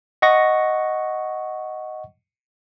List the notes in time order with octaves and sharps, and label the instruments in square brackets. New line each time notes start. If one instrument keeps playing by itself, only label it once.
[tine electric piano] D#5 F#5 C#6 A#6